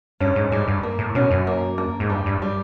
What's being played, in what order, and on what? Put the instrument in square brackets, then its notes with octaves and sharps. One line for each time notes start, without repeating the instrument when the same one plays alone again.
[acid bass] G2 [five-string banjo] C#4
[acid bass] G#2
[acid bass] G#2 [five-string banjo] G3
[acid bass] G2
[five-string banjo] A#3
[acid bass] A2
[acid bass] B2 [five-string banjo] C#4
[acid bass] F#2
[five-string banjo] A#3
A#3
[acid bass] G#2
[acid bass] G2 [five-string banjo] G3
[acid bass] G2
[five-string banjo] G3